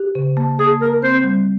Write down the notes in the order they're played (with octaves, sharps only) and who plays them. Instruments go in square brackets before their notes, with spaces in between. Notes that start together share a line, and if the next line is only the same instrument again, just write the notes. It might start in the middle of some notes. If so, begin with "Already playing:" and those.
Already playing: [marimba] G4
C#3
A#3
[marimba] A#3 [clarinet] G#4
[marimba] A#3 [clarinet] A#4
[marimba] C4 [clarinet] C5
[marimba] G3